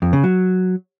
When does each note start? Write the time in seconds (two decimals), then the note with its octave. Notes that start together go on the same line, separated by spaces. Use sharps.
0.02 F2
0.13 C#3
0.24 F#3